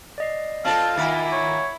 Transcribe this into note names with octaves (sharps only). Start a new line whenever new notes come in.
D5 D#5 C7
C4 F4 A4 F5 A5
D#3 A#3 E4 F4 E5 F#5 G#5
C#5